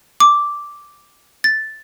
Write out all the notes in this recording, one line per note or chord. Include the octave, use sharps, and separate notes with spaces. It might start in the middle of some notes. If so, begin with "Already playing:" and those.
D6
A6